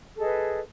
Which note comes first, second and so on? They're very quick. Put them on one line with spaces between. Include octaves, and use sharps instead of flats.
A4 G#4 D#5 B4